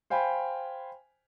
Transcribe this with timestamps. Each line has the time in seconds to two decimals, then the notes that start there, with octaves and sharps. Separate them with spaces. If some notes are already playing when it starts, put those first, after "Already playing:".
0.10 C5 F5 G5 G#5 B5